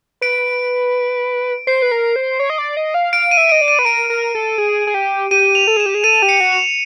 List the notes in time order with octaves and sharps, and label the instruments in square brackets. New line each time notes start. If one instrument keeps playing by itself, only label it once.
[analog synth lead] B4 [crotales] D7
[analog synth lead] C5 [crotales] C7
[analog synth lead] B4
A#4
C5
C#5
D#5
D5
D#5
F5
[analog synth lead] F5 [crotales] D7
[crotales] D#7
[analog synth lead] E5
[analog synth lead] D#5 [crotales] D7
[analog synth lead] D5
[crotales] D#7
[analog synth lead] B4
[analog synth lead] A#4 [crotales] D7
[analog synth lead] A#4
A4
G#4
G#4
G4
[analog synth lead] G4 [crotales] D#7
[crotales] F7
[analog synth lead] A4
[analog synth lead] G#4 [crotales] E7
[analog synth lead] G4
G#4
[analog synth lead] A4 [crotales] D#7
[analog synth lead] G4
[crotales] C#7
[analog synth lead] F#4
[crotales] F7